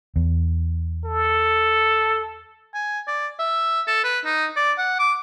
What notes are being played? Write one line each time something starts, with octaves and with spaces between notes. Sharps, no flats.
E2
A4
G#5
D5
E5
A4
B4
D#4
D5
F#5
D6